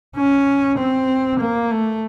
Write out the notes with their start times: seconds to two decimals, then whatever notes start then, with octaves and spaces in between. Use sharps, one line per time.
0.16 C#4
0.78 C4
1.40 A#3
1.71 A3